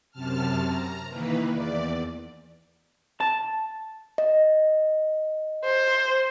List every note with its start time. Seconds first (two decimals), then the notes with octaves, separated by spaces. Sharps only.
0.11 F#2 C3 A5 F6
0.63 A#5
1.07 D#3 E3 A#3 B4
1.51 E2 D5
3.20 A5
4.18 D#5
5.65 C5